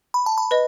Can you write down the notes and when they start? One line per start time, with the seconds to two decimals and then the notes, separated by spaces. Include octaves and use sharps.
0.14 B5
0.26 A5
0.38 B5
0.51 B4 D#5